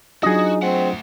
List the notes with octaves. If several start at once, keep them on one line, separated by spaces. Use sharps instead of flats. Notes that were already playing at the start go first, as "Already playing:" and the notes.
F#3 D4 D#4 F4 F#4 G#4 D#5
A3 C4 F#5